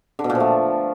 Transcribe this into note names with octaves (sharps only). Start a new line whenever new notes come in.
D3
B2
A#2
F3
A3